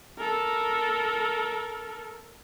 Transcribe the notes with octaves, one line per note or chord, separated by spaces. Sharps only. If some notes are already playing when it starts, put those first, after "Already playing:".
A4 A#4